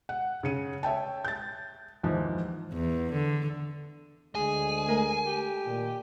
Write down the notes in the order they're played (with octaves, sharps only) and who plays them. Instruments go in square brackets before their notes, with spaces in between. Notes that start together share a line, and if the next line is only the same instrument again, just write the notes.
[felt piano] F#5
C#3 C#4 C#7 D#7
C#5 E5 G5 A5
G6 A6
D#2 G#2 E3 F3
[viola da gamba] E2
D3
[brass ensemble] D2 G#3 [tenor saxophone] G#4 [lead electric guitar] G#5
[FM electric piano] A3 A#4
[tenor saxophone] G4
[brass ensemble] A#2 D#3